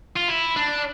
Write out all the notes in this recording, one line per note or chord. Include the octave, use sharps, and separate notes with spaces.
F4
E4
D4